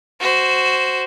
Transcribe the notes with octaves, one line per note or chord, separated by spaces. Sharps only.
F#4 C5